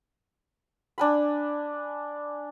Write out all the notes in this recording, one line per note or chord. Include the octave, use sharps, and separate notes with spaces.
D4 G#5 B5